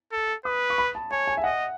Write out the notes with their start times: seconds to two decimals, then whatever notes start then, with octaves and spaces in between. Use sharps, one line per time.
0.12 A4
0.45 B4 D#6
0.70 C#6
0.78 B5
0.95 A5
1.11 C#5 G#5
1.27 G#5
1.37 E5
1.44 D#5 F#5